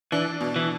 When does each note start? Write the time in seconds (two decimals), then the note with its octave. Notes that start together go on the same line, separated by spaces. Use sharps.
0.12 E3 D4
0.41 B2
0.56 E3